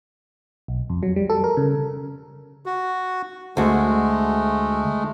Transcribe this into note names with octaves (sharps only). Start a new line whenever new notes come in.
B1
F2
F#3
G3
A4
A#4
C#3
F#4
D2 G#3 A3 F#4